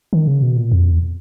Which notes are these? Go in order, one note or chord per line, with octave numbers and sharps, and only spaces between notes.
D#3
C#3
B2
A#2
F2
E2